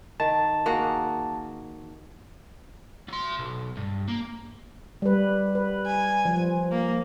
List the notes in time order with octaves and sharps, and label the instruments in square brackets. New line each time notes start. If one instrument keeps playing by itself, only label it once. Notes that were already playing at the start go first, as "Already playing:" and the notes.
[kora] D#3 [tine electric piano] A5
[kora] A#3 F#4 G#4
[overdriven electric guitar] F#3 C6
B1
G2
A#3
[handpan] G3 B4
B4
[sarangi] G#5
[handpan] F3
[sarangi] A#3